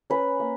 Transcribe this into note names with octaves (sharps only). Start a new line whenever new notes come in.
C#4 B4
A#3